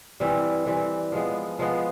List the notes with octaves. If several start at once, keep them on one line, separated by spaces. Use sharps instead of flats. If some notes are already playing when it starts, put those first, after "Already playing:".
E3 G3 C4
E3 G3 C4
F3 G#3 B3
F3 G#3 B3